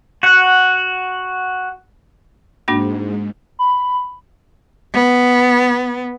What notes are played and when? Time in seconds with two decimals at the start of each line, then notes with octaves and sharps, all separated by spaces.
0.23 F#4 F#5
2.68 G#2 A#3 D4 F#4
3.59 B5
4.94 B3